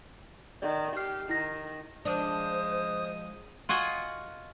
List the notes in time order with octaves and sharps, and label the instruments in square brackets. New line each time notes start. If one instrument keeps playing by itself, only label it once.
[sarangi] D#3 [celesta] D5
[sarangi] G4 [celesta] F6 C7
[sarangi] D#3 [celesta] E4 A#6
[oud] F3 D4 [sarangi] G#3 [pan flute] C5 [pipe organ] D#6
[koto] F4 F#4 D#5 G#5